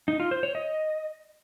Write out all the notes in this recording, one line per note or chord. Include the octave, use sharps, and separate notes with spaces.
D#4
F4
C5
C#5
D#5